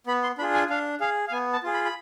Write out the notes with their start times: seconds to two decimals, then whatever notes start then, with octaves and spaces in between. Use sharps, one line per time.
0.07 B3 B5
0.23 C6
0.38 D4 F4 G#4 B5
0.54 G#5
0.70 D4 F5
1.00 G#4 F5
1.28 F5
1.32 B3 G#5
1.53 A5
1.63 F4 G#4
1.74 B5
1.85 B5